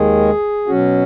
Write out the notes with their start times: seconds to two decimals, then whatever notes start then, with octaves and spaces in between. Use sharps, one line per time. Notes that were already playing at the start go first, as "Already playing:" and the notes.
Already playing: D#2 D#3 G#3 G#4
0.67 B2 F#3 C#4 F#4